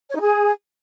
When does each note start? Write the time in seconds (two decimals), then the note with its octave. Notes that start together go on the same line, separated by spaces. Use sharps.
0.09 C#5
0.15 D#4
0.21 G#4